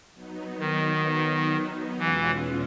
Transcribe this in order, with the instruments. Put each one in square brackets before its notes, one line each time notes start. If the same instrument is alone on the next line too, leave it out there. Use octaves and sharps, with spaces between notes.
[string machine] F#3 B3 D#4
[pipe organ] D#3
[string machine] E2 B2 G#3 C#4 F4 [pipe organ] E3